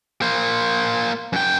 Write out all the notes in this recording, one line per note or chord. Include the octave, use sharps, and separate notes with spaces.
A#3 C5
F#2 G5